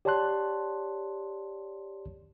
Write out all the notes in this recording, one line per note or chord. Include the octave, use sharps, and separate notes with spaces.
G4 C#5 D5 A5 C6 F#6